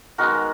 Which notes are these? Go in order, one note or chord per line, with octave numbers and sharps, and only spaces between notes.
D#3 G#3 B3 F#4 A#4